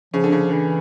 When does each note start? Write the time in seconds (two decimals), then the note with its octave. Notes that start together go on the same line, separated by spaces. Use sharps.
0.14 C#3 F3
0.24 D3
0.32 C#3
0.51 D3 E3